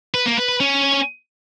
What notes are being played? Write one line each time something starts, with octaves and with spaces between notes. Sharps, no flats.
B4
A#3
B4
B4
C#4